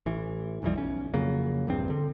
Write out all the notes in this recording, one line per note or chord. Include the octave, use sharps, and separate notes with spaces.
A1 E3
B1 F2 E3 G3
B1 C#4
F2 C#3 F#3 A#3
A#1 E2 G2 C4
D3